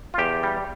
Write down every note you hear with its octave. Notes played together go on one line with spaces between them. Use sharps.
F4
E2 G4
G3